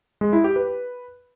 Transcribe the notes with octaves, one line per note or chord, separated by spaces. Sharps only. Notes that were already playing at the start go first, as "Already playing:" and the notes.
G#3
E4
G4
B4